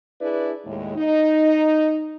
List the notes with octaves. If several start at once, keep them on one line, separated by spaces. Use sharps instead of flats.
D4 E4 G#4 B4 D5
D#2 A2 G#3
D#4